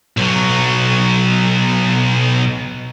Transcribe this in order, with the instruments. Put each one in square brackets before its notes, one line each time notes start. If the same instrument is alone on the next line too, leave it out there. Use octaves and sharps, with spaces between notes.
[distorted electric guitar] B1 F#3